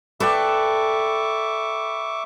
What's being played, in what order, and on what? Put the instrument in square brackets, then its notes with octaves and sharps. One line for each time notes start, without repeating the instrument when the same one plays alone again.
[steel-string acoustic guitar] A4 [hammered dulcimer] B4 D5 G5 [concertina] E5 C#6 D6